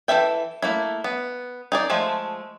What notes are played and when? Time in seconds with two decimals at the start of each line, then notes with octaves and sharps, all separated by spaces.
0.08 E3 D4 A4 E5 G5
0.62 A3 A#3 E4
1.04 B3
1.72 D#4 G#4 D5
1.90 F3 G#3 A3